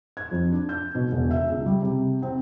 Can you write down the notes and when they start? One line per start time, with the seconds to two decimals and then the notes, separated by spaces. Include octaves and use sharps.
0.17 G#6
0.31 F2
0.52 D4
0.69 G6
0.95 B2
1.12 E1
1.31 E5
1.50 C#2
1.66 G3
1.82 C3
2.22 C4